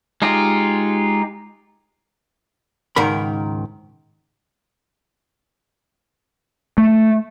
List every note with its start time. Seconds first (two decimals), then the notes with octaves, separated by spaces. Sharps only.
0.22 G#3 D#4 F4 G4
2.96 C#2 G#2 D#3 A#4 B5
6.78 A3